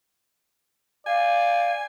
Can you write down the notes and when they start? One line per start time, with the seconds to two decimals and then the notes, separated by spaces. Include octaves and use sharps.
1.06 D5 F5 G#5